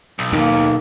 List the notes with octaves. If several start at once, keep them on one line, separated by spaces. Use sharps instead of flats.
B1
D#2 D#3 A#3